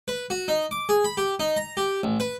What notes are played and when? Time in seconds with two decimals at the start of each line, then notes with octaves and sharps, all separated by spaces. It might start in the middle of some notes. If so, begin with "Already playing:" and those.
0.08 B4
0.30 F#4
0.48 D#4
0.71 D6
0.89 G#4
1.04 B5
1.17 G4
1.40 D#4
1.57 A#5
1.77 G4
2.03 A1
2.20 B4